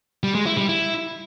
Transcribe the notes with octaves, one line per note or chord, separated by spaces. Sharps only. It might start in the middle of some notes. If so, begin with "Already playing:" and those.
G3
G#3
E4
G3
E4